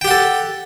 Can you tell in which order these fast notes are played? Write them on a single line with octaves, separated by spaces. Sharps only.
G5 G4 F#5 A4